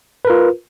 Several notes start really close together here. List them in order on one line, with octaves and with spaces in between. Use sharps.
B4 A#4 F4